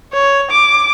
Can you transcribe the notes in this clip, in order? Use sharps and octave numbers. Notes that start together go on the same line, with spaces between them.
C#5
D6